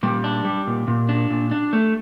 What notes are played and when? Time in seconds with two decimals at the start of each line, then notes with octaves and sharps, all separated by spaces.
0.03 A#2 G3 G4
0.24 D4
0.45 G3
0.67 A#2
0.88 A#2
1.09 D4
1.31 A#2
1.51 D4
1.73 A3